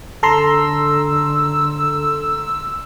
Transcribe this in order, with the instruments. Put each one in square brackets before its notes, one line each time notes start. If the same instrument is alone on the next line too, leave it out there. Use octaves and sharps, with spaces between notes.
[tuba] D3 [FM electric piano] A4 A#5 C6 [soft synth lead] E6